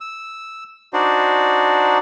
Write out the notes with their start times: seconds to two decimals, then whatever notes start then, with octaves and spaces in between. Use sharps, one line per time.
0.01 E6
0.93 D4 D#4 F#4 C5 D5